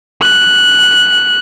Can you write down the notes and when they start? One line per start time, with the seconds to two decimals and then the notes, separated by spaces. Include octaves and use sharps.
0.21 F#6